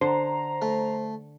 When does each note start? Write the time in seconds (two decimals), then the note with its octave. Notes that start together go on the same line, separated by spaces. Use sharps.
0.01 D3 C5 A#5
0.62 A3